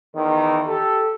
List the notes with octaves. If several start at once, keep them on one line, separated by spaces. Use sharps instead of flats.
E2 D#3
G4 A4